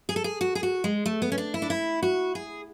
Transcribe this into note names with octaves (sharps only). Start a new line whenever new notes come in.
G#4
A4
G#4
F#4
G#4
F#4
G#3
A3
B3
C#4
D4
E4
D4
E4
F#4
G#4